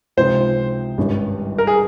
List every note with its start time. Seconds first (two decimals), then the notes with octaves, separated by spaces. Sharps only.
0.17 C#2 C3 F3 G#3 D#4 C5
0.98 G#1 G2 G3 C#4
1.58 A#4
1.67 G#4